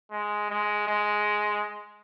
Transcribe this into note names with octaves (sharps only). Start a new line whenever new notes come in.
G#3
G#3
G#3